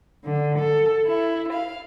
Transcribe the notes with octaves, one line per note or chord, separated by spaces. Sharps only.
D3
A4
E4
F5